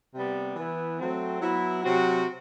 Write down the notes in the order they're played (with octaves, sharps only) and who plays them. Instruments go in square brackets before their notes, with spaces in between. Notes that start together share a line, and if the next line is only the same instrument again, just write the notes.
[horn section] C3 G3 B3
E3 B3 E4
F#3 A3 C4
F#3 B3 E4
C3 F#3 C4 F#4